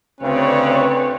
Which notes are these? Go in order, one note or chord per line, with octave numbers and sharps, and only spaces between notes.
D2 C#3 C4 B4 C#5 D5